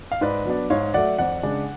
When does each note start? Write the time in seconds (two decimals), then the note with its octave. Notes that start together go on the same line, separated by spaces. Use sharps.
0.12 F5
0.21 G#2 B4 D5
0.46 F#3 B3 D4
0.70 G#2 C#5 F5
0.94 F#3 A3 D5 F#5
1.18 F2 D5 F#5
1.43 C#3 G#3 D4